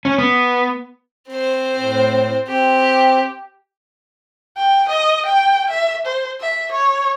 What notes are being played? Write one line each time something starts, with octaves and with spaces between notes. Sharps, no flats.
C#4
B3
C4 C5
A2
C4 G4
G5
D#5
G5
E5
C5
E5
C#5